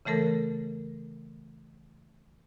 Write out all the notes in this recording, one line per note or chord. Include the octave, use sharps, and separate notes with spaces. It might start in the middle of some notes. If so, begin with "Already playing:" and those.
C#3 E3 A3 A4 A#4